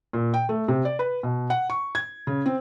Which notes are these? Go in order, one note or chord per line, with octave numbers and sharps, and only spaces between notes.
A#2
G5
A3
C3
D5
B4
B2
F#5
C#6
G#6
C#3
C4